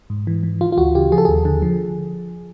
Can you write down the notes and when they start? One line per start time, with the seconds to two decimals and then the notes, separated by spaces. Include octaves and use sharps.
0.10 G#2
0.27 E3
0.43 E3
0.61 E3 F4
0.72 F4
0.77 D2 F#4
0.95 C#3 G4
1.12 F3 G#4
1.18 A4
1.25 D#2 G#4
1.45 D3
1.62 F3